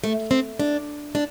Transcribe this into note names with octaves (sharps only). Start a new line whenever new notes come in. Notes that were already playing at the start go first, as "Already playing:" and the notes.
A3
C4
D4
D4